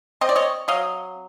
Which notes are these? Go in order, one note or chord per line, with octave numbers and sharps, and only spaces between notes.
C4 D#5
D5
C#5 D#5
F#3 D#5 F5